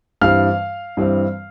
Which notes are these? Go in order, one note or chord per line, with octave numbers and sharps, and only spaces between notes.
G2 E3 G3 C4 F5 F6
G2 E3 G3 C4